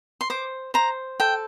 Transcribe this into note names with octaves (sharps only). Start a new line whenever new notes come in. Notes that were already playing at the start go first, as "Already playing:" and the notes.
C6
C5 D6
C5 A#5
A4 G5